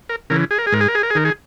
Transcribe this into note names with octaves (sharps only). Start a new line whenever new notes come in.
A#4
C#3 E3 A#4
G#4
A#4
G#4
G#2 A#4
G#4
A#4
G#4
A#4
G#4
D#3 A#4
G#4